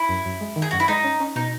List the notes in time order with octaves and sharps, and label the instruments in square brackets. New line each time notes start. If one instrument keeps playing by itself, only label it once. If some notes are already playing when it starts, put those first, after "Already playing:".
Already playing: [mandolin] E4
[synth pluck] F#2
F#2
G#3
D#3
[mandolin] G#4
[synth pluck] F#2 [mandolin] F#4
[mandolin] E4
[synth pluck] G#3 [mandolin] D#4
[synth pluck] C#4
C#4
[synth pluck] B2 [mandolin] D#4